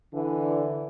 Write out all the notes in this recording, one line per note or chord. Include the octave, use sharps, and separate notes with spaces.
D3 E3